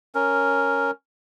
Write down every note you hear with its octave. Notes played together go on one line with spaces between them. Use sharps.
C#4 A#4